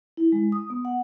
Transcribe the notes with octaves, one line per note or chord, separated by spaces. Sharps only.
E4
G#3
D#6
B3
F#5